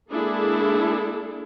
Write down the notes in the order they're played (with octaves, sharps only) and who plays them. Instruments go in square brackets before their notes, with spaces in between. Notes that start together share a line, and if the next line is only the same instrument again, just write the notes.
[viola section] G#3 A#3 D4 E4 G#4 A4